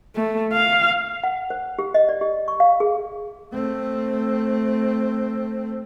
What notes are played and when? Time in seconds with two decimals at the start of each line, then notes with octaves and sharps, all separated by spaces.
0.16 A3
0.53 F5
1.23 F#5
1.50 C5
1.79 G4
1.94 D#5
2.09 D5
2.21 G4
2.48 C#6
2.60 F5
2.80 G#4
3.53 A3 C4